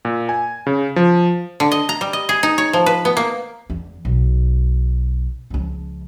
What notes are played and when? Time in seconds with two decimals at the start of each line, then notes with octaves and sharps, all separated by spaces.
0.05 A#2
0.29 G#5
0.67 C#3
0.96 F3
1.60 D3
1.72 D#5
1.89 A#5
2.01 G3
2.13 D#5
2.29 G#4
2.43 D#4
2.58 C#5
2.73 F3
2.86 B4
3.05 B3
3.17 A#3
3.70 E2
4.05 B1
5.50 C#2 F3